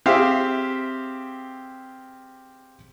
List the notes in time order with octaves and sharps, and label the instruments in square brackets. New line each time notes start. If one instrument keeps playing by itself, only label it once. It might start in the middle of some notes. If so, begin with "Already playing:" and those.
[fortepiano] C4 G4 G#4 C5 E5 F5